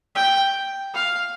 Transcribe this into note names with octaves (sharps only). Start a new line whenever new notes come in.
G5
F5